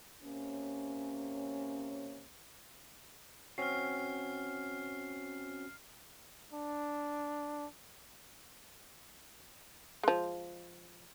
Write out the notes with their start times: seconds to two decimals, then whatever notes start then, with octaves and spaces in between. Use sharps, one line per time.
0.23 C3 A#3 C#4
3.58 C4 C#4 F#4 F6 C7
6.53 D4
10.03 F3 G#3